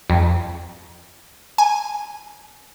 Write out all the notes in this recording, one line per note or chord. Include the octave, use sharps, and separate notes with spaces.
F2
G#5